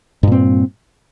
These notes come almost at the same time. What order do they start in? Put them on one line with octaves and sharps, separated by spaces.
G2 A#2 C4